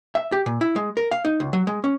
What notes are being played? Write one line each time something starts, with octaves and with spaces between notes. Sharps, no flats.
E5
G4
A#2
E4
G#3
A#4
F5
D#4
C#2
F#3
G#3
C#4